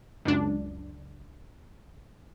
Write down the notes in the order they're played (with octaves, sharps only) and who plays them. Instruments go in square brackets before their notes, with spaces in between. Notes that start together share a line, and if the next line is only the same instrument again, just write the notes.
[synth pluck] C#2 F#2 D4